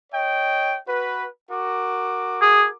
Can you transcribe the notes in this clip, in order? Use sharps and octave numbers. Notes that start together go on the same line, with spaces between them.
C#5 D#5 G5
F#4 B4
F#4 A#4 D6
G#4